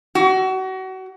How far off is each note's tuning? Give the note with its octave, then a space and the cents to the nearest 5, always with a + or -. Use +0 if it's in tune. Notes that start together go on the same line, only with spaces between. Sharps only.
F#4 +30